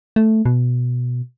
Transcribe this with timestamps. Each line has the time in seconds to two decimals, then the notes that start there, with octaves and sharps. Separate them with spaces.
0.16 A3
0.46 B2